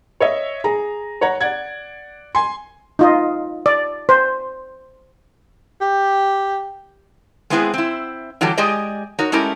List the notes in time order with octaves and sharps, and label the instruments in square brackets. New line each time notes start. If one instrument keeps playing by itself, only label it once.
[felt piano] C#5 D#5 E5
G#4 A#5
C#5 F#5 A#5
D5 F#5 G#6
G#5 C6
[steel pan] D#4 F4 D#5
D5
C5
[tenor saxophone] G4
[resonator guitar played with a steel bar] G#3 B3 C4 E4 G4 G#4
C4 E4
D3 E3 F#3 G3 G4 A4
G#3 G4 G#4 D5 D#5
D#4 F#4 A#4 C#5
G#3 A3 C#4 E4 G4 A#4